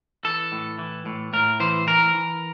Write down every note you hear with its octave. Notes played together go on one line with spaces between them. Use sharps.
E3 A4
A2
E3
A2
A2 A#4
E3 C5
E3 A#4
E3